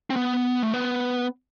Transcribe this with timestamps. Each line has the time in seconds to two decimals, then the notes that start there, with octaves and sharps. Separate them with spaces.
0.10 C4
0.16 B3
0.63 A3
0.74 B3